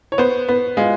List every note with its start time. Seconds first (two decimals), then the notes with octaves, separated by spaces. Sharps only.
0.12 C#5
0.18 B3 C5
0.49 B3
0.77 G#3 F4